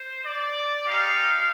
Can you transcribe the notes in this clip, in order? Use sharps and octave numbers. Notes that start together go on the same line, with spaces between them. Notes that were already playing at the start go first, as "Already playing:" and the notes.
Already playing: C5
D5
G#3 D#4 G4 F5